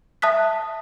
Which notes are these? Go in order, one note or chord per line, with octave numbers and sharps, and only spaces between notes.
E5 A5 D#6 F#6 B6